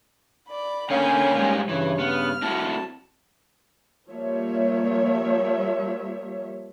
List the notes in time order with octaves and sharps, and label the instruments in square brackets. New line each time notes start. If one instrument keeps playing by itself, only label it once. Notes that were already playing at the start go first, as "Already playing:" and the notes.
[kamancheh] D5 B5
[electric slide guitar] D3 C#5 F5 [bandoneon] A#3 C#4 [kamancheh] G5 G#5
[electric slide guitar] G#2 G3 G#3
[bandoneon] G2 C#3 [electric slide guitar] E3 [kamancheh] C#5
[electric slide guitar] B3 [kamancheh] F6
[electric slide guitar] C4 E4 F#4 [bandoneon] A5
[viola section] F3 G3 A#3 C#5 E5